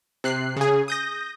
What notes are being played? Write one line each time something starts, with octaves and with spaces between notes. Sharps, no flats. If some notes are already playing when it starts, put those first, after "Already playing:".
C3 F#6 C7
C#3 G#4
D#6 G6 A#6